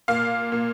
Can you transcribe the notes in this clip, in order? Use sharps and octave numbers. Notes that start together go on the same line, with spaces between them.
A#2 F5
A#2